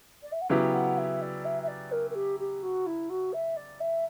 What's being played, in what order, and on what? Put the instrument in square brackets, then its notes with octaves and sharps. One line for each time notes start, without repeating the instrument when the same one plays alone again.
[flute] D5
E5
F#5
[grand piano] C#3 F#3 B3 E4 G4 [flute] G5
[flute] F#5
E5
D5
E5
E5
D5
A#4
A#4
G4
G4
F#4
E4
F#4
E5
D5
E5